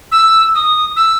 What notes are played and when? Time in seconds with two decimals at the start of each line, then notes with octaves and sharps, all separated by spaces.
0.12 E6
0.55 D#6
0.96 E6